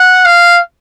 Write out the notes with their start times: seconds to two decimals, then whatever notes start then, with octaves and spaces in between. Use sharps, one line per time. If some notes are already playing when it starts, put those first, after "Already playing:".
Already playing: F#5
0.25 F5